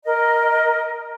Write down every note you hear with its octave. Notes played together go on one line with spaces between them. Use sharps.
A#4 D#5